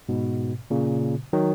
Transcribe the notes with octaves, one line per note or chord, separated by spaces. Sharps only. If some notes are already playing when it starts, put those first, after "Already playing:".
G#2 B2
A#2 C#3
D#3 F#3